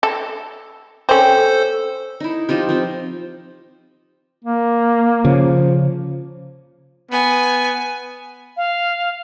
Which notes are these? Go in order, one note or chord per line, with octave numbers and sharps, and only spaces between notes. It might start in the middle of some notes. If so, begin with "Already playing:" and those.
A4
C4 C#4 A4 C5
D#4 E4
F3 D#4 F4 G4
F3 C4
A#3
C#3 F3
B3 G#5
F5